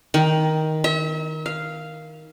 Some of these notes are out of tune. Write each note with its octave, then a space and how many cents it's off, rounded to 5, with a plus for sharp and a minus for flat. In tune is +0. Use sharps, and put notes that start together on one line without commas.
D#3 +10
E5 -40
F5 -5